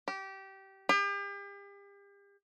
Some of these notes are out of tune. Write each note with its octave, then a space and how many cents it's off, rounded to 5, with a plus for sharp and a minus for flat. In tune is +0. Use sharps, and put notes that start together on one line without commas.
G4 -20
G4 +40